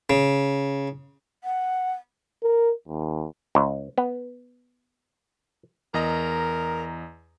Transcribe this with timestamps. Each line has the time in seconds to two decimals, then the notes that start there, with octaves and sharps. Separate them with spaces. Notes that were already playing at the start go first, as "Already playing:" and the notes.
0.10 C#3
1.44 F#5
2.43 A#4
2.88 D#2
3.55 C#2
3.98 B3
5.94 E2 A#4 D#5 A#5